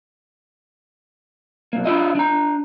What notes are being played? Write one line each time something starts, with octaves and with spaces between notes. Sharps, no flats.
B1 A#3
D4 E4 F4 D#5
D4 A#5